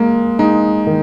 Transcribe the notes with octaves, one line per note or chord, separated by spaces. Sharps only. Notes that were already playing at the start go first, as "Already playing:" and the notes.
Already playing: G#3 A#3
G#3 D#4
D#3